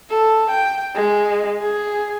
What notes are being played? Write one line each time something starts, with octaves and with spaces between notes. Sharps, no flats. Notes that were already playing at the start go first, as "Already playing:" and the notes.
A4
G5
G#3
G#4